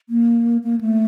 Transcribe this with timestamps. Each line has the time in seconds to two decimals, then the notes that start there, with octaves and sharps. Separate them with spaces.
0.09 A#3
0.64 A#3
0.81 A3